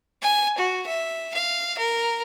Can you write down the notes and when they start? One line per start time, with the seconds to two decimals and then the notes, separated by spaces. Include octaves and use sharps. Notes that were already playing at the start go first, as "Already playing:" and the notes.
0.22 G#5
0.58 F#4
0.87 E5
1.34 F5
1.78 A#4